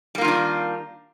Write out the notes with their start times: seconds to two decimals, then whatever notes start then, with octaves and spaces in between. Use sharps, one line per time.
0.15 G3
0.18 A#3
0.21 F4
0.25 D#3
0.28 D4